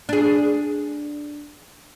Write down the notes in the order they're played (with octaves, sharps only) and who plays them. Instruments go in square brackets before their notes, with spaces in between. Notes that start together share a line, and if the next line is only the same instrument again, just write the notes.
[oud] D4 G#4